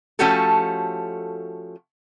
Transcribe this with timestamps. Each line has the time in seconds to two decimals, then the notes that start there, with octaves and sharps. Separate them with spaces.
0.19 F3 A3 C#4 F#4 G4 A4